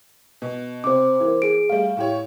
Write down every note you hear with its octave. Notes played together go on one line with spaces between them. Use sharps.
B2
C3 C5 D6
E3 A#3
G#4 D7
G3 A3 F5
A2 G4 C#5